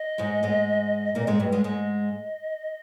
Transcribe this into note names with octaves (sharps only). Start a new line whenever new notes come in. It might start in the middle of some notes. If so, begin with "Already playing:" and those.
Already playing: D#5
G#2 G#3
G#2 G#3
A#2 A#3
G#2 G#3
G2 G3
G#2 G#3
G#2 G#3 D#5